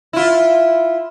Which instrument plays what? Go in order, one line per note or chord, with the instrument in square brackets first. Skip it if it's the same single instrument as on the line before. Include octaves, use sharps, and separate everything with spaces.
[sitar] E4 F4